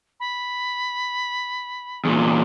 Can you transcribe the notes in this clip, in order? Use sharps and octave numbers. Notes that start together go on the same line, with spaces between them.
B5
E2 A#2